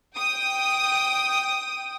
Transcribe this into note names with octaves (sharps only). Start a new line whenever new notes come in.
G5 D#6